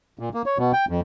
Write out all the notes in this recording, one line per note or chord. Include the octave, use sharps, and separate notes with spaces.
A#2
A#3
C#5
B2
G5
F2